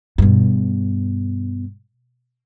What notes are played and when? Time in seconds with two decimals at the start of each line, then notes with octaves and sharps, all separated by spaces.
0.18 G2 B2